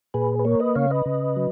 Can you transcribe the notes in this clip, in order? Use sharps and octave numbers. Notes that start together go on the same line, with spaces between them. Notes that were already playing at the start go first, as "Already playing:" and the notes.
A#2 G#4 B4
B4
A#3 A#4 C#5
B4 D#5
C#3 C#5 F5
B4 D#5
C#3
F#3